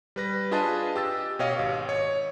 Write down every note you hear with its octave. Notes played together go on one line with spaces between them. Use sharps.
G3 B4 A#6
D4 F4 G#4 B4 D#5 A5
G4 E6 A6
B2 G4 C#5 D#5 F5
G#1
C#5